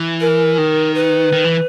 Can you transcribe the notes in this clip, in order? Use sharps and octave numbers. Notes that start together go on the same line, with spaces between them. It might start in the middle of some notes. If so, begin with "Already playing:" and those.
Already playing: E3
A#4
D#3
B4
D#3
E3